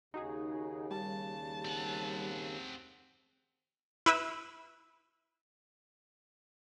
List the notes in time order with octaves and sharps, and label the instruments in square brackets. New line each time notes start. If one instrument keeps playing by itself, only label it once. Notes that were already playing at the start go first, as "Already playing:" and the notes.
[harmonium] D#2 C#3 [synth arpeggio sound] D#4 F#4 G#4
[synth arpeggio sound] G3 [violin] A5
[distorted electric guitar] C4 F#5
[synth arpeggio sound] E4 B4 E5